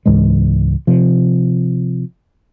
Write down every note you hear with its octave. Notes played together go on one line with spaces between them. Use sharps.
C#2 G#2 E3 G#3
C3 F3